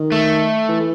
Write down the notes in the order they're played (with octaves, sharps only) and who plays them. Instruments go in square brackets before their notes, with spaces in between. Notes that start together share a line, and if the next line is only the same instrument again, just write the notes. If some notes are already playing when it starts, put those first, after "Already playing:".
Already playing: [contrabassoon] D#3
[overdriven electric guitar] A3
[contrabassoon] E3